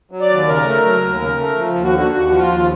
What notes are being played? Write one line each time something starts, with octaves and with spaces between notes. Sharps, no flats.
F#3
D5
D#2
C#3 A#4
A3
F#3
D#2
C#3
A3
F3
D#2
F#4
D3
F#4
D#2 F#4
F3
F4
D#2